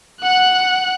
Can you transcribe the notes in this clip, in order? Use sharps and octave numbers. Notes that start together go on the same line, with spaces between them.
F#5 F#6